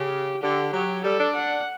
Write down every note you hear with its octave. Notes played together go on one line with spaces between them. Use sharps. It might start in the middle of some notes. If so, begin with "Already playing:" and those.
Already playing: C#3 G4
D3 G4
F#3 G4
G3 A4
D4
F#5